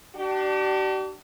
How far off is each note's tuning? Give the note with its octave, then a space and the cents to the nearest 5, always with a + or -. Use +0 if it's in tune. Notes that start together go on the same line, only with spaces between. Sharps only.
D4 +15 G4 -40